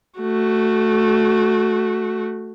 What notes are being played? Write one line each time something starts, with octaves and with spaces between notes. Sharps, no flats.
A3 F#4